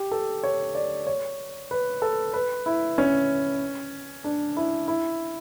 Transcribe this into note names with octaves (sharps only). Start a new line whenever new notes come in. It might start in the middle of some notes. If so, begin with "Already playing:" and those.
Already playing: G4
A4
C#5
D5
C#5
B4
A4
B4
E4
C#4
D4
E4
E4